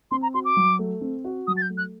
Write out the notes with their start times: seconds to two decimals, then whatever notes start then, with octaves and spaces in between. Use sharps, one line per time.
0.11 C4 C6
0.22 A#5
0.34 F#4 C6
0.45 D6
0.57 F#3
0.79 A3
1.01 C4
1.24 F#4
1.47 F#3 D#6
1.57 A6
1.62 G6
1.70 A3
1.77 F#6